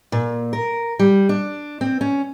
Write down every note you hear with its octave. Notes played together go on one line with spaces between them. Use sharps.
A#2
A#4
G3
D4
C4
C#4